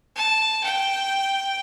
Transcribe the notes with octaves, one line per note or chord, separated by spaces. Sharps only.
A5
G5